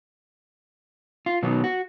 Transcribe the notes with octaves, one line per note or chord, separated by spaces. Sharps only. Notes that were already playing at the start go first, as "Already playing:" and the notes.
F4
B2 D#3 F#3 B3
F#4